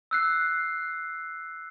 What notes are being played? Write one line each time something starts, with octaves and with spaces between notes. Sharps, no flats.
E6 F#6 C7